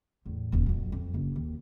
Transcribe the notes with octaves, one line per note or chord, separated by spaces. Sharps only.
E2 A2
D#1 E3
F2 F#3
F2
F#1
D#2